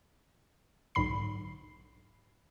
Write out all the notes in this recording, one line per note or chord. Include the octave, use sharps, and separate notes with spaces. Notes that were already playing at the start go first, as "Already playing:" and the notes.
B1 G#2 D3 B5 C7